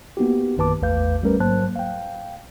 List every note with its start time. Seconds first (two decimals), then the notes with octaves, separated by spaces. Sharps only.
0.17 A#3 B3 D#4 F#4 G4
0.57 A#1 F#2 D#3 B4 A5 D6
0.81 A1 E2 A3 B4 F5 G6
1.23 G3 A3 C#4 A#4 B4
1.40 G#2 F#3 A#3 C5 A5 F#6
1.76 F5 G5